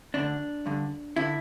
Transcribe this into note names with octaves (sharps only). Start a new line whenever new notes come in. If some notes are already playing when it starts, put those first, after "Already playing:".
D2 D3 D4
G2 D3
D3 E4